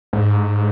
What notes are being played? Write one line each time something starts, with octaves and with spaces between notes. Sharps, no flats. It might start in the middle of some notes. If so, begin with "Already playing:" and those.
G#2